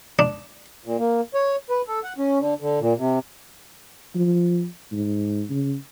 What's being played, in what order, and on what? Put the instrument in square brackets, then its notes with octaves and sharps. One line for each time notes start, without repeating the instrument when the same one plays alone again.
[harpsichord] D4
[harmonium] A#2
A#3
C#5
B4
A4
F#5
C#4
D3
D3
A#2
C3
[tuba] F3
G#2
C#3